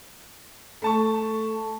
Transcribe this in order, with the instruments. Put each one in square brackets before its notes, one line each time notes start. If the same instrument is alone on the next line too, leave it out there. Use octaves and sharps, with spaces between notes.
[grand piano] A3 A5 C#6